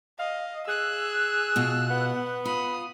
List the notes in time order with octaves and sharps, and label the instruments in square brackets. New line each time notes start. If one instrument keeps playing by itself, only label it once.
[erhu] D#5 [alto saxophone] F5
[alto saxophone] G#4 [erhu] E6 [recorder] F#6
[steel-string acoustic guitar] B2 F4
[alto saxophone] B3 [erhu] F#5
[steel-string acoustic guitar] F4 [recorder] B5 [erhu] D#6